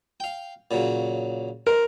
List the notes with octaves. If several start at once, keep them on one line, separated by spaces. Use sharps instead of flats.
F5 G5
A#2 C#3 F#3
A#4 C5